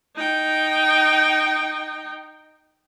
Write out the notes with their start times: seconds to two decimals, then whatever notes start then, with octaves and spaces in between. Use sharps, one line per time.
0.16 D#4 G5